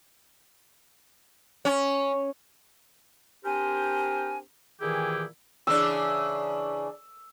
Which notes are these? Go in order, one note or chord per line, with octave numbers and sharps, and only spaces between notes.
C#4
C4 D4 G4 A#4 C5 G#5
A#2 D#3 E3 E4 G4 G#4
C#3 E3 D4 E6